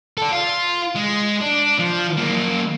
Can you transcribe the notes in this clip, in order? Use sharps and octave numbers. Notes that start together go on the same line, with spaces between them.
D4 A4
F4
G#3
D4
F3
F#2 A#3